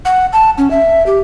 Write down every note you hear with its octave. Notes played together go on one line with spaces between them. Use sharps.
F#5
A5
C#4
E5
G4